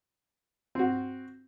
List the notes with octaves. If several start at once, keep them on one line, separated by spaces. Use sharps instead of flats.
C4 F#4